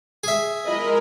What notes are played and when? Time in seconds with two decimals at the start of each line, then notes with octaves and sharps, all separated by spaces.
0.24 G#4 E5
0.66 G#3 E4 A#4 D#5 B5